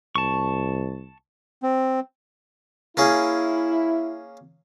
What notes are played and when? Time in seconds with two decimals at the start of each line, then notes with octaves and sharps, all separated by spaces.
0.16 C2 A5 C#6
1.63 C4
2.97 A#3 C#4 E4 G#4